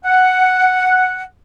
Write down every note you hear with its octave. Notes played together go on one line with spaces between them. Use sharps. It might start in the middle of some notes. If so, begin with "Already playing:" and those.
F#5